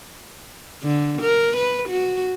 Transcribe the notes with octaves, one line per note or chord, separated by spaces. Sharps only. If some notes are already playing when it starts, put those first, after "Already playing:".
D3
A#4
B4
F#4